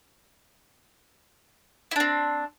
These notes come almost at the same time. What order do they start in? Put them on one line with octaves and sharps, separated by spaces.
E4 D4 C4